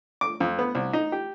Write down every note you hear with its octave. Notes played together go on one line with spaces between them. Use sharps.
D6
F2
B3
C2
D#4
G4